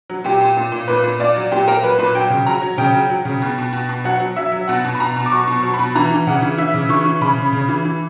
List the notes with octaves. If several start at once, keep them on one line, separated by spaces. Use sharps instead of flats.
F#3
A#2 G4
A#2
A#2
A#2
A#2 B4
A#2
A#2 D5
F#3
A#2 G4
A#2 A#4
F#3 B4
A#2 B4
F#3 G5
C#3
F#3 A#5
F#3
C#3 G5
F#3
F#3
C#3
B2
B2
B2
B2
F#3 F#5
F#3
F#3 E5
F#3
B2 F#5
B2
B5
B2 A#5
B2
D6
F#3 C#6
B2
C#6
F#3
B5
B2
E3 A#5
E3
C#3 F#5
E3
E3 E5
C#3
E3 C#6
E3
C#3 B5
C#3
C#3
E3
E3